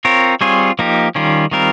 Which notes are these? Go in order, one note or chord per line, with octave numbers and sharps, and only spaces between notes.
C4 F4 A#4 C#5
G3 C4 F4 G#4 C#5
F3 A#3 D#4 G4
D#3 G3 C#4 F4
D#3 G3 C4 F4 A#4